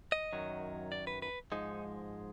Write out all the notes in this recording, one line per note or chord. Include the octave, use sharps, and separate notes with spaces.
D#5
F#2 D#3 F#3
D5
B4
B4
G#2 F3 G#3 D#4